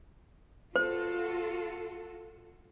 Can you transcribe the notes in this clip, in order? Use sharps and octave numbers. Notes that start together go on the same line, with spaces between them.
F4 F#4 A4 C5